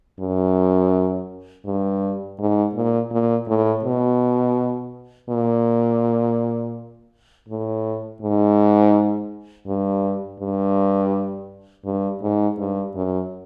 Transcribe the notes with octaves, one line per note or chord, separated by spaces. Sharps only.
F#2
G2
G#2
A#2
A#2
A2
B2
A#2
A2
G#2
G2
G2
G2
G#2
G2
F#2